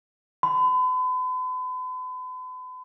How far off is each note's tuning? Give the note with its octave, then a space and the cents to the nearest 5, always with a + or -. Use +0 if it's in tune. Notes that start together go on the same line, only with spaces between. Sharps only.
B5 +45